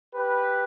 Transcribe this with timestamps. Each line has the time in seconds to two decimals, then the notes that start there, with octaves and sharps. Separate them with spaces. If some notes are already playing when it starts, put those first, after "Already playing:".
0.15 G4 B4